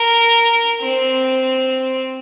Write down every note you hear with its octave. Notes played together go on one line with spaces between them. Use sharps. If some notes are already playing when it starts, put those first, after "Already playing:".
Already playing: A#4
C4